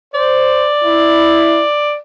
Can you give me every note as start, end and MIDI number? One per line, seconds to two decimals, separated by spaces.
0.14 0.69 72
0.14 1.96 74
0.83 1.63 64